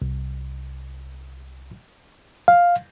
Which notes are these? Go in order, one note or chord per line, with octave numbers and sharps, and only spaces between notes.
C2
F5